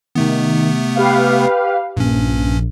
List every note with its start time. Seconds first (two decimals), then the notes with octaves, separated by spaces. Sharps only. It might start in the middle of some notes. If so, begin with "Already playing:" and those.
0.15 C3 D#3 A3 B3
0.96 G4 B4 F5
1.97 A#1 G2 C#4